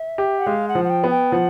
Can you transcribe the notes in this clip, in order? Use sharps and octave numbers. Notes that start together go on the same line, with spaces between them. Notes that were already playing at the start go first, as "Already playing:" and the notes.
Already playing: E5
G4
F#5
G#3 F5
F#5
F3
F#5
G5
B3
G5
F3 F#5